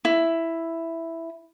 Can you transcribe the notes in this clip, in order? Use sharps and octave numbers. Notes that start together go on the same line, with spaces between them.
E4